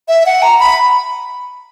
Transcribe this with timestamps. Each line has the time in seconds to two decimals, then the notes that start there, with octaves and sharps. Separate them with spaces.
0.08 E5
0.26 F#5
0.42 A#5
0.60 B5